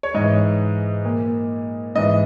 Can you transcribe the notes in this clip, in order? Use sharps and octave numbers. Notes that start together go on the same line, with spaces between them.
C#5
G#2 E3 D#5
A#2
G#2 E3 D#5